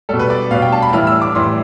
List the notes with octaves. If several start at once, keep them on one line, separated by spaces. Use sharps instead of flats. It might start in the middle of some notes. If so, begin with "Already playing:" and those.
B2 G3 A4
B4
D5
B2 G3 F5
G5
A5
B5
A2 E3 G3 F6
E6
D6
A2 E3 G3 C6